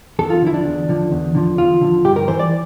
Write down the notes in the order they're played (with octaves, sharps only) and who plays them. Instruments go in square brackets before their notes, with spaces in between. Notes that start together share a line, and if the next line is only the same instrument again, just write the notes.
[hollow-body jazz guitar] E2 A4
F4
D3 F3 E4
D4
E2
D3 F3
E2
D3 F3
E2 F4
D3 F3
G2 G4
A#4
E3 C5
D5